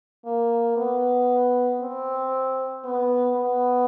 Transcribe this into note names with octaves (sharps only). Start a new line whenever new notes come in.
A#3
B3
C4
B3
B3